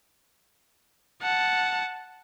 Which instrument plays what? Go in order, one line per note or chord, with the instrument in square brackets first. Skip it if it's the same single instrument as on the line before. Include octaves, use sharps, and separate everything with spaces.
[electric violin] F#5 A5